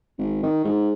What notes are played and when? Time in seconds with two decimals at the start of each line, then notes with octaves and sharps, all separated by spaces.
0.18 G#1
0.43 D#3
0.64 G#2